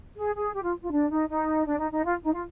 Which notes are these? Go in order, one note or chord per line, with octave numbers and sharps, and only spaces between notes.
G#4
G#4
G4
F4
F4
D4
D#4
D#4
D4
D#4
D#4
F4
D#4
F4